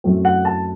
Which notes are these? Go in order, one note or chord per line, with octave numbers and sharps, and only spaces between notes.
F#2 F#3 A3 C4
F#5
A5